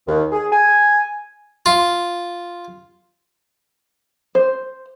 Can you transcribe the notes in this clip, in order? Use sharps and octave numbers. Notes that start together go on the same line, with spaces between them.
D#2
G#4
G#5
F4
C5